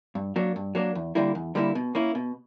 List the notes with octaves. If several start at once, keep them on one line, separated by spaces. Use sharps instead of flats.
G2
F#3 A#3 D4
G2
F#3 A#3 D4
E2
D3 G3 A#3 E4
E2
D3 G3 A#3 E4
B2
A#3 C#4 E4
B2